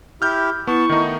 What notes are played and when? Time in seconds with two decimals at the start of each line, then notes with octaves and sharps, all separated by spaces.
0.22 E4 G4 F6 G6
0.67 B3 E4 A5 C#6
0.89 D#3 A3 B3 D#4